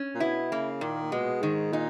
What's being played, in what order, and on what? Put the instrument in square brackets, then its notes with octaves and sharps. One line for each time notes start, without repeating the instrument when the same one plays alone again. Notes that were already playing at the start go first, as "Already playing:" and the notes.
Already playing: [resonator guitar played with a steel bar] C#4
[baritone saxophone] A#2
[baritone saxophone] B2 [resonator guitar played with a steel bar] E4
[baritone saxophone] C#3 [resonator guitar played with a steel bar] A#3
[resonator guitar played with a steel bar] A#2 [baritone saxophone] D#3
[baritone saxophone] B2 [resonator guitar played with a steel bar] G#3
[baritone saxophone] G#2 [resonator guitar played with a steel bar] D#3
[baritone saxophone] A#2 [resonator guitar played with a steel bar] D#4